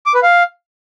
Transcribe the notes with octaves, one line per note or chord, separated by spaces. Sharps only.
D6
B4
F5